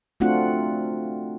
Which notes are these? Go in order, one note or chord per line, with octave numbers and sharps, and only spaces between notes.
A3 C4 D4 F4 F#4 F#5